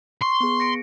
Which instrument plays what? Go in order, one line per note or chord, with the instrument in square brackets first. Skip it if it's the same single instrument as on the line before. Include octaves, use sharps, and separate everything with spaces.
[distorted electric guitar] C6 [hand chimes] C#6
[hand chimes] B3 G#4
A#6 C#7 D7